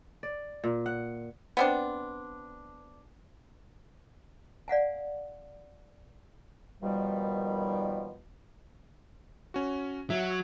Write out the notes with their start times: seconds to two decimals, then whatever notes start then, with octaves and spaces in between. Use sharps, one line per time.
0.23 D5
0.64 A#2
0.86 F#5
1.57 B3 C4 D4
4.68 D5 F5 F#5 G#5
6.82 D#2 B2 D#3 F3 G3
9.54 C#4 F#4
10.10 F#3 E5